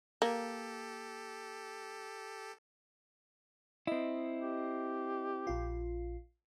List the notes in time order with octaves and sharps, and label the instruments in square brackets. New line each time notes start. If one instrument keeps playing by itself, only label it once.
[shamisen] A#3 [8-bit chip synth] G4 A4
[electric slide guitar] C4 E4 [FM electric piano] D#5
[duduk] G4
[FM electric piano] A#1 F4